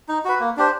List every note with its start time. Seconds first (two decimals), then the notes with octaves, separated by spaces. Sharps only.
0.09 D#4
0.25 F#4 B4
0.40 A#3
0.57 D4 G4 C5